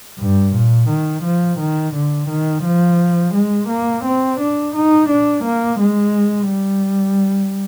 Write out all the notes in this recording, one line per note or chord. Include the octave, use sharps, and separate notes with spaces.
G2
A#2
D#3
F3
D#3
D3
D#3
F3
G#3
A#3
C4
D4
D#4
D4
A#3
G#3
G3